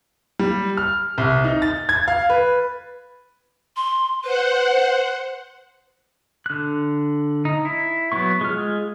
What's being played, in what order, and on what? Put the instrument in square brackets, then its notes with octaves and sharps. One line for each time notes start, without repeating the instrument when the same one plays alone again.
[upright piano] G3
F6
C2
D#4
A6
G#6
F5
B4
[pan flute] C6
[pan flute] B4 [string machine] C5 F#5
[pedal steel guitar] D3 F#6
D#4
E4
F#3 B3 C#6
G#3 F4 F6